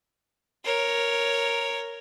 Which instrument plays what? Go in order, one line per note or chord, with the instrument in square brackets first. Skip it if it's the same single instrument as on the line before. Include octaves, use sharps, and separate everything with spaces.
[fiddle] A#4 C#5